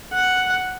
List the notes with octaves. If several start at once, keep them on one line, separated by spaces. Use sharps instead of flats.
F#5